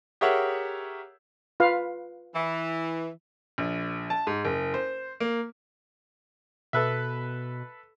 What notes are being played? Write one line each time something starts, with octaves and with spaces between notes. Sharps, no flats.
G4 G#4 A#4 C#5 E5 F#5
F4 B4 F5
E3
A#1
A5
G#2
F#1
C5
A#3
B2 A4 B4 E5